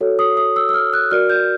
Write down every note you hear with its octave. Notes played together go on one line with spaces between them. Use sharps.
F#4 A4 C#5
D#6
D#6
E6
E6
F6
F#6
F#4 A#4 D5 F6
G6